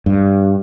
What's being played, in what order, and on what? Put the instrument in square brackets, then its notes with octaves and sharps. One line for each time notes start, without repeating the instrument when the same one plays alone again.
[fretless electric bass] G2